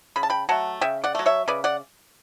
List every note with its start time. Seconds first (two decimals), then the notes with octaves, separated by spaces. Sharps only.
0.16 C#3 B5
0.23 A5
0.30 G5 B5
0.49 F#3 A3 F#5 A5
0.81 C#3 E5 G5
1.04 D5 F#5
1.15 F#3 A3
1.26 C#5 E5
1.48 C#3 B4 D5
1.64 D5 F#5